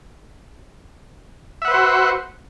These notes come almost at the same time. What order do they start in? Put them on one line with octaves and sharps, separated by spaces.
E5 F#5 B4 C5 F#4